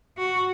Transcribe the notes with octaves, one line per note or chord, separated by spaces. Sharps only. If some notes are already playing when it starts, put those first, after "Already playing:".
F#4